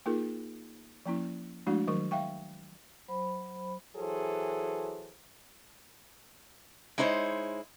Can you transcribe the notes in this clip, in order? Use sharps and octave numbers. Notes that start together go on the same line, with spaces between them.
A#3 D#4 F4 G#4 A#4
F3 A#3 C#4 E4
F3 G#3 A3 D4 E4 F#4
D#3 F#3 A#4 C#6
E5 F5 G5 C#6
F#3 C5 B5
E3 F#3 G#4 A4 C5
G#3 D#4 E4 C5 C#5